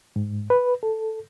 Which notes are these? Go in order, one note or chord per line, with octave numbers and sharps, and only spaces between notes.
G#2
B4
A4